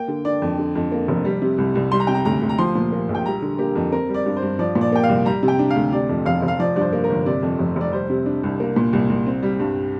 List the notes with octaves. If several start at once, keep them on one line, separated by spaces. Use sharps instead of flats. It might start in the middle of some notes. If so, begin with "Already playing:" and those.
Already playing: A#3 G5
D3
D4 D5
F2
D3
F2
A#3
F1
G3
C3
C2
C2
G3 C6
A#5
C3 G5
A#5
D2 A#5
D2
A#5
F3 C6
A#2
A#3
A#1
G5
G3 A#5
D3
A#3 G4
F2
C4 A#4
G3
D5
G2
C5
G2
F3 D5
A#2
D5
A#3 G5
F5
C2
G3 A#5
C3
G5
D4
F5
D2
C3 D5
F2
F1 F5
F1
F5
F3 D5
G2 D5
C5
A#3
A#4
G1
C3 D5
F2
F1
F1 D5
G3 C5
C3
D4
C2
A#3
A#2
C2
C2
C4
G3
G2